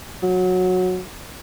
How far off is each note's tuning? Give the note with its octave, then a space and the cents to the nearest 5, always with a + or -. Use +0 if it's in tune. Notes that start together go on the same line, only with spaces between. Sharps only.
F#3 -15